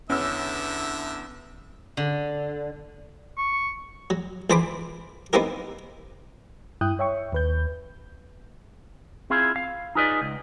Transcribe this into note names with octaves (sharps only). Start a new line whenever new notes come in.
E2 D3 C#4 E5 E6
D3
C#6
F#3
C#2 E3 C5 A5 B5 D6
B3 C4 D#4 E4 G4 A#4
G2 E4 G5 D#6 F#6 G6
C#5 E5 G5 C#6
D#2 B4 G6
C4 E4 F4 G#4 F5
F5
D#4 F4 G#4 B4 D5 D#5
C#2